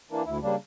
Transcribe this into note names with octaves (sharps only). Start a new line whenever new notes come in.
E3 A#3 D4
D2 E4
C#3 G3 A#3 D4